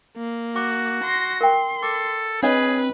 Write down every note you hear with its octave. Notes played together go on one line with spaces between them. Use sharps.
A#3
F#4 D6
C6 A#6
A#4 G5 C6
A4 D6
C4 D4 G#4 B4 C#5 D#5